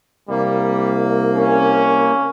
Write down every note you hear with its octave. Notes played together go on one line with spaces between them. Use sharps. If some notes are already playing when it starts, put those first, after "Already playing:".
C2 G3 A#3
C#4